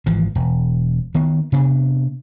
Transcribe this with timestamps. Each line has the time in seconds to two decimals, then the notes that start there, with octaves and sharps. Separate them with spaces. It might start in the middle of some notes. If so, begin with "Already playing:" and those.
0.06 G#1 E3 F3
0.35 E1
1.15 D#3 B3
1.52 C3 B3 D4